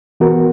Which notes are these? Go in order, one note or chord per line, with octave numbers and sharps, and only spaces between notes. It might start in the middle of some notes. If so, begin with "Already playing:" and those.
E3 B3 F#4 A#4